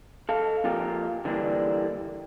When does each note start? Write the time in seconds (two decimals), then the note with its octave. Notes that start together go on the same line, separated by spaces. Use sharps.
0.29 A4 F5
0.64 F2 A#2 F4 G4 A#4
1.25 D3 E3 G3 A#3 D4